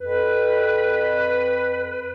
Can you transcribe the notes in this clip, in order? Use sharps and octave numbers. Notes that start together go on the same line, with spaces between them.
F2 B4